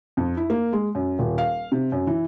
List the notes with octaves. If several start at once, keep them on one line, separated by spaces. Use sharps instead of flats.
F2
E4
A#3
G#3
F#2
D#1
F5
C3
F#2
E3